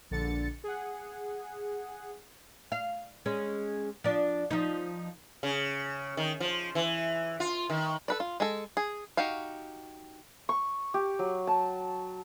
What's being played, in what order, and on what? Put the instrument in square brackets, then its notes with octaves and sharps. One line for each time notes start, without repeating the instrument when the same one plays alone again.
[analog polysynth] A#1 D3 A6 C#7
G#4 F#5
[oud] F5
G#3 C#4
F3 D4
F3 D#4
[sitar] C#3
D#3
F3
E3
F4
D#3
[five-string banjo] A4 B4 D5
F4
G#3 A4
G#4
D#4 F#4 G4 F5
[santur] C#6
G4
F#3
A5